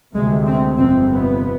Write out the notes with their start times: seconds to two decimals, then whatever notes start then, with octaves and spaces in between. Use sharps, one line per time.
0.15 D2 C3 G#3
0.46 C4
0.78 G1 F2 C3 C4
1.10 B3